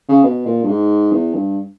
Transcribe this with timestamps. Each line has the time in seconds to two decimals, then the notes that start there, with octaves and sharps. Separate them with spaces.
0.09 C#3
0.23 B2
0.46 A#2
0.63 G2
0.68 G#2
1.12 E2
1.34 G2